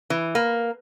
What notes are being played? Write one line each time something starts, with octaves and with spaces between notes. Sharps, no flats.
E3
A#3